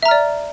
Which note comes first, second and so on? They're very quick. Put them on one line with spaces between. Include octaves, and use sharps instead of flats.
E5 A#5 F6 D5